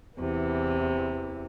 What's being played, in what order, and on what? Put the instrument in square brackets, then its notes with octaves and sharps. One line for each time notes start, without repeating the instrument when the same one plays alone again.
[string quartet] E2 C3 E3